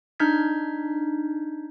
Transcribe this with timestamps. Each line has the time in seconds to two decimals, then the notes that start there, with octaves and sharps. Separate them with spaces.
0.20 D4 D#4 F6 G6 G#6 B6